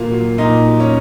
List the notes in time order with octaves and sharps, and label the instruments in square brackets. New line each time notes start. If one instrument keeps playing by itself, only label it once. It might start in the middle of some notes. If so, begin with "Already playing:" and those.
Already playing: [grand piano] A#2 F#3 A#3 [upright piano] F4
[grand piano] F#3
[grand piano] A#2 [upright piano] D#4
[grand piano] F#3
[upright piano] C#4